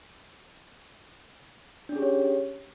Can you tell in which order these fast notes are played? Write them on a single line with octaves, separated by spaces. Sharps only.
D4 C#4 G#4 G4 C#5